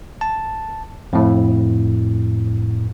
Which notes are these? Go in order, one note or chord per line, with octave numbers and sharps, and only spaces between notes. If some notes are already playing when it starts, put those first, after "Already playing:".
A5
F2 A2